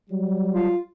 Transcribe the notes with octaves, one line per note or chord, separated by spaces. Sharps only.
F#3 G3
F4